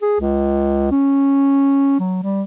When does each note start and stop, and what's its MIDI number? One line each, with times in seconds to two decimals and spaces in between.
0.02 0.18 68
0.20 0.90 37
0.91 2.00 61
2.00 2.20 54
2.23 2.42 55